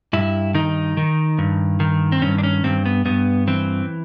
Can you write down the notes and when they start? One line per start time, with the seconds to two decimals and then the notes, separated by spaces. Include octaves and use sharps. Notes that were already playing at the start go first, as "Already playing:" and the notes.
0.13 G2 E4
0.54 D#3 D#4
0.97 D#3
1.38 G2
1.80 D#3
2.12 C4
2.22 G2 C#4
2.38 D4
2.43 C#4
2.64 G2 C4
2.86 B3
3.05 G2 B3
3.47 E3 C4